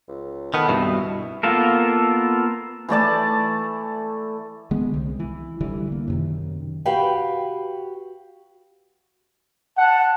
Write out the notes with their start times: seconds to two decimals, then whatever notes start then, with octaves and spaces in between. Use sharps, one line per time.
0.08 C#2
0.54 D#3 B3 A4
0.69 C2 G2 B2 E4
1.43 A#3 B3 F4 A4 A#4
2.89 E3 A3 D5 A5
4.71 D3 G#3 B3
4.94 C2
5.19 E3
5.60 C2 D3 E3 G3
5.92 A#3
6.08 F#2 C3 D#3
6.85 F#4 G4 B4 F5 G5
9.77 F#5 A5